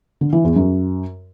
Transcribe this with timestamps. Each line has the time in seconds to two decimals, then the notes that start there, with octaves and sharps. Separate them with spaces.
0.21 D3
0.33 E3
0.44 E2
0.56 F#2